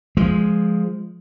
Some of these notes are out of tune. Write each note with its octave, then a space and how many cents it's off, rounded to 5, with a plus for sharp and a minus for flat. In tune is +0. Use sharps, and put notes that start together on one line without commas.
F3 +0 G#3 +0